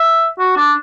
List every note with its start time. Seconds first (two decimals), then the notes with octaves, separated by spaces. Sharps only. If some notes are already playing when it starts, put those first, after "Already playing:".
Already playing: E5
0.39 F#4
0.57 D4